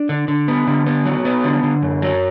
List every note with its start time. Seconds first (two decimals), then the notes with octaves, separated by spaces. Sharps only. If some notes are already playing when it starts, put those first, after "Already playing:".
Already playing: D4
0.09 D3
0.28 D3
0.48 B3
0.67 D3
0.86 B3
1.05 F#3
1.25 B3
1.44 D3
1.63 D3
1.82 F#2
2.02 F#3